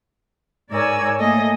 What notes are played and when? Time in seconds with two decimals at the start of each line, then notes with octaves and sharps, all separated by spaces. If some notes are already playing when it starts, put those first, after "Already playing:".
0.71 G#2 A#4 C#5 D5 G#5 E6
1.18 A3 A#3 A4 D#5 G#5